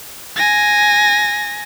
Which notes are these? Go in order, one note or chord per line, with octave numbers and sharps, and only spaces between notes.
G#5 A#6